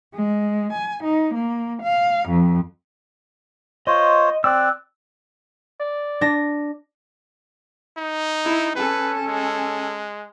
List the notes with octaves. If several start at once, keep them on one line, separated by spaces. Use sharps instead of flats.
G#3
G#5
D#4
A#3
F5
F2
F4 C5 C#5 D#5
C4 D5 E6 F#6
D5
D4 A#6
D#4
E4
C#4 A4 B4
G#3